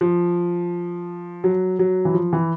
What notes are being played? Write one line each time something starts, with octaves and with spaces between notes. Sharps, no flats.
F3
F#3
F#3
E3
F3
E3